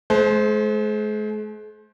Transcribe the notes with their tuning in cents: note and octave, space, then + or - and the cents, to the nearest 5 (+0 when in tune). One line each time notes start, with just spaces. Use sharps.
G#3 +45 C5 +0